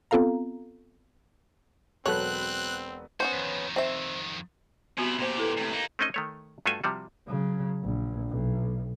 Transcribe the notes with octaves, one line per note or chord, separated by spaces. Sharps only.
B3 C4 F4 A4 F5 A#5
E1 F#3 C4 A4 B4 C#5 F#6
B3 C#4 F#4 C5
F2 D#3
C4 E5
C3 B3 E4 F#4
A#2 A#3 G4 C5
E4 A4 B4
A2 C3
A#3 D#4
A3 C4 C#4 D#4 D#5
D#3 A3 C#5
G2 A3 F4 F#4 A4 G#5
C3 F3 G3 F#4
C#3 F#3
A#1
B1